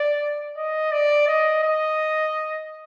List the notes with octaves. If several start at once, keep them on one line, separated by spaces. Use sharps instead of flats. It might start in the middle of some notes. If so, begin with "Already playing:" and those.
Already playing: D5
D#5
D5
D#5
D#5